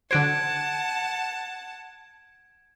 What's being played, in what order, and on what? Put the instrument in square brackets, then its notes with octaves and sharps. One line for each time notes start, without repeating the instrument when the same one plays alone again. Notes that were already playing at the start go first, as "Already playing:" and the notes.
[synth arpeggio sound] D3 F#4 C5 [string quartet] F#5 A5 [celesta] G#6 D7